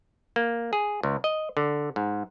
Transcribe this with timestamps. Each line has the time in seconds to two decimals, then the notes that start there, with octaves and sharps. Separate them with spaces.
0.36 A#3
0.73 G#4
1.03 C#2
1.24 D#5
1.57 D3
1.96 G#2